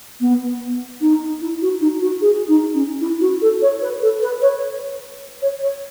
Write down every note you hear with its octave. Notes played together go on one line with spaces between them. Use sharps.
B3
D#4
E4
F#4
D#4
F#4
G#4
D#4
C#4
E4
F#4
A4
C#5
B4
A4
B4
C#5
C#5
C#5